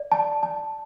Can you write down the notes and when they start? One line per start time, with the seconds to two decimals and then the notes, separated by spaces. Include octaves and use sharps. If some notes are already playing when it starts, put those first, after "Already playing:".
Already playing: D5
0.12 A5
0.43 A5